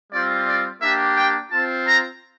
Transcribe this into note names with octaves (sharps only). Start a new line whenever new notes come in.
G3 C4 F4 D5
D5
A#3 D4 G4 E5
G5
C4 F4 A5
A#5